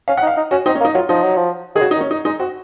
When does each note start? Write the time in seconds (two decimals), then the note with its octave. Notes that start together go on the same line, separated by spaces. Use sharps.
0.08 C#4 F5
0.17 F#5
0.22 D#4
0.27 F5
0.37 D#4
0.51 C#4 F#4
0.66 C4 D#4
0.75 C#4
0.81 A#3
0.85 D#4
0.94 F#3 F4
1.09 F3 D#4
1.23 F#3
1.36 F3
1.75 D#3 G#4
1.81 C#3 F#4
1.91 D#4
1.96 D#3
2.00 C#4
2.11 D#4
2.25 G#3 D#4
2.39 C4 F#4